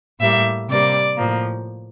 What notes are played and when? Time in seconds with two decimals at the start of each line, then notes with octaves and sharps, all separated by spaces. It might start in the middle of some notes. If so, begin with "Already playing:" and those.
0.20 A2 G3 A#3 E5
0.68 C3 G3 A#3 D5
1.16 A2 F3 A#3